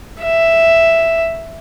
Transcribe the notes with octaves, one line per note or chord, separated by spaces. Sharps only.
E5